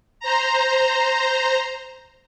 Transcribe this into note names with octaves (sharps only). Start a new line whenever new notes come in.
C5 A#5